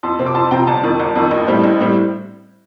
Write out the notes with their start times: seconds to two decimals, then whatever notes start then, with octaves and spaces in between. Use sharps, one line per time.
0.03 F2 A5 C6
0.19 C3 F3 C4
0.26 D6
0.35 F2 A5 C6
0.51 C3 F3 C4 G5 A#5
0.67 G1 A5
0.83 F2 D#3
1.00 G1
1.16 F2 D#3
1.31 A1
1.47 A2 G3 C4
1.63 A1
1.80 A2 G3 C4